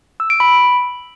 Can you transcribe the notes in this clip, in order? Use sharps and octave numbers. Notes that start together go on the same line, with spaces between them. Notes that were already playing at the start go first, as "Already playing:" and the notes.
E6
D7
B5